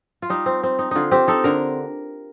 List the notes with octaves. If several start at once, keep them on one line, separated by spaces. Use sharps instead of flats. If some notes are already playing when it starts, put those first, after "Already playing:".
F4
G3 D#4
C4
C4
D#4
D3 D#4 F4
C4 G4
D#4 A4
D3 A#4